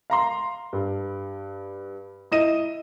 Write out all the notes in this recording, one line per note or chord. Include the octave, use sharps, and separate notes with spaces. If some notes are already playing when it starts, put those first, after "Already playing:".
F5 A#5 C6
G2
E4 D#5 D#7